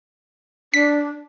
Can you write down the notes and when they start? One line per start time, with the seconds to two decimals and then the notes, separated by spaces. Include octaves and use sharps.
0.74 D4 B6